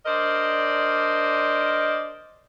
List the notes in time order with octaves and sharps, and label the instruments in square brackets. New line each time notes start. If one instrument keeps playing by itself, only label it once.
[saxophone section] D4 A#4 C5 D5 D#5